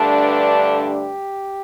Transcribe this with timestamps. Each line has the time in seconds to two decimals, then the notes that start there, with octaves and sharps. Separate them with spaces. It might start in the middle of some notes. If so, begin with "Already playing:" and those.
Already playing: G2 D3 A3 D4
0.22 B4
0.54 A4
0.84 G4